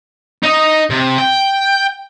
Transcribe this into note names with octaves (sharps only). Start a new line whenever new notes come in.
D#4 D#5
C3
G5